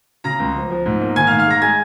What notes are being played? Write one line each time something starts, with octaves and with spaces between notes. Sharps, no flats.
C#3 A#5 A#6
C#2
F3
F3
G#2
A#3
D#3 G#5 G#6
F5 F6
G#2
F5 F6
G#3 A#5 A#6
G#3 G#5 G#6